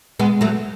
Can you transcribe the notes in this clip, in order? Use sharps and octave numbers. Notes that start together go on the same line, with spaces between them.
G#3 B3
F#3 A3